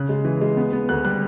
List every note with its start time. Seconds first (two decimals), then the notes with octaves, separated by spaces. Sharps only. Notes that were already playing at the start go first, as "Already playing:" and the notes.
Already playing: C#3 F#6
0.09 G#3
0.25 E3
0.41 G#3
0.57 B3
0.72 B3
0.89 D2 F#6
1.05 G3 F#6